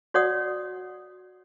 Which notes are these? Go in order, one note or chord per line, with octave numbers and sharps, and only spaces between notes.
F#4 C#5 D5 F#5 D#6